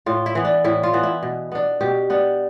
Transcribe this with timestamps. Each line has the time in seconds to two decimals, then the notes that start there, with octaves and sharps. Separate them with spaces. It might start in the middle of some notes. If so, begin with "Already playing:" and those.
0.06 A2 F4
0.26 E4
0.35 E3 B3
0.45 D4
0.64 A2 E4
0.83 F4
0.93 E3 B3
1.03 E4
1.23 B2
1.52 B3 D4
1.81 B2 G4
2.10 B3 D4